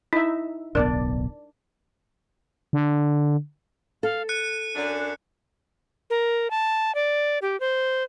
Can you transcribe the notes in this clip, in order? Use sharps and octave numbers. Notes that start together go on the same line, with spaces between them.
D#4 E4 E5
D1 B1 B3 D4 A#4 D5
D3
A4 F5
F#6 C#7 D#7
F#2 D4
A#4
A5
D5
G4
C5